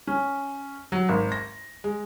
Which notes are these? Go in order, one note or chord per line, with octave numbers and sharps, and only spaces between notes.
C#4
F#3
G#1
A#6
G#3